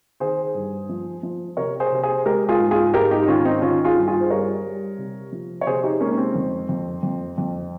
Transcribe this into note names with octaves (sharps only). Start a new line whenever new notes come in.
D#3 G#4 C5
G2
F3
F3
C3 A#4 C#5
G#4 C5
C3
G#4 C5
G#3 G4 A#4
F4 G#4
G#2
F4 G#4
G#2 G4 A#4
D#4 G4
D#4
D#3 C#4 F4
C4 D#4
D#3 C#4 F4
F4 G#4
G2
F4 G#4
C5
G3 A#4 C#5
G3
C3
F3
C#5
C3 G#4 C5
D#4 G4
G#3 A#3 C#4
C#4
C4
F2
F2
F2
F2